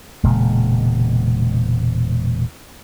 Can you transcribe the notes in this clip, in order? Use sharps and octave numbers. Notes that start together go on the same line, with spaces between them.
E1 A#2 C#3 G#3